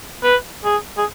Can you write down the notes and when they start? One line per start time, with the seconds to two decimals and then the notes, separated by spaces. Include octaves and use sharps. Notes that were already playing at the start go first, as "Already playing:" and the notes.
0.23 B4
0.64 G#4
0.98 G#4